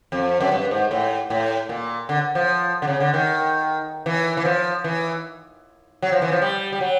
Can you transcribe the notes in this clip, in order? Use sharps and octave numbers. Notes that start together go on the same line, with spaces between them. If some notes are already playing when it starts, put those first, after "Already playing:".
F2
F#2
G2
G#2
A2
A2
A#2
D3
F3
D3
C#3
D3
D#3
E3
E3
F3
E3
F#3
F3
E3
F3
G3
G3
F#3